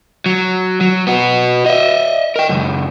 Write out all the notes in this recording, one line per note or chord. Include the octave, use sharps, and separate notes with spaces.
F#3
F#3
B3 F#4
D#5 E5
A#4 G5
C#2 F#2